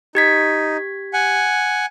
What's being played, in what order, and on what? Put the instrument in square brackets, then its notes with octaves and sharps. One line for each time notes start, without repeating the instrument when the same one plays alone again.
[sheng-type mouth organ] D#4 [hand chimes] G4 G#6 B6
[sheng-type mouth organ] F#5 G#5